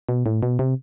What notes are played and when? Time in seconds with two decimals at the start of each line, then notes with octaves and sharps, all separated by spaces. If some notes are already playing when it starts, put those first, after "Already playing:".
0.09 B2
0.26 A2
0.43 B2
0.59 C3